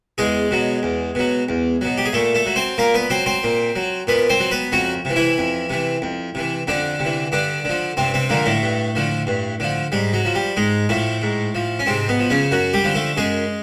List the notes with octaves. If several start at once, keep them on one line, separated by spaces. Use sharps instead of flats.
E2 G#3 G#4
B2 F#3
E2
B2 F#3
E2
B2 F#3
G4
G#4
A#2 A3 A4
A3 A4
F#3
C4 C5
A#2 A#3 A#4
B3 B4
F#3 C4 C5
C4 C5
A#2
F#3
A#2 B3 B4
C4 C5
F#3
B3 B4
F2 F#3 F#4
C3 E3
E3 E4
F2
C3 E3
F2
C3 E3
F2 D3 D4
C3
E3
G2 D3 D4
D3 F3
G2 C3 C4
C3 C4
A#2 D3 F3 A#3
A2 A3
G2
D3 F3
G2
D3 F3
G#2 G3
F#3
F3
G3
G#2 G#3
A2 F3 A3
G#2
F3
C#4
G#2 C3 C4
B2 B3
F3
C#3 C#4
F#2 F#3 F#4
G3 G4
D3 F3
A3 A4
F#2 G#3 G#4